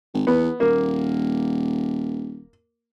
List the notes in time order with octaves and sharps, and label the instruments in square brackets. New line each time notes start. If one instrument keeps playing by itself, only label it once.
[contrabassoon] G#1
[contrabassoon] E2 [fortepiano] B3
[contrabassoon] D#1 [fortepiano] A#3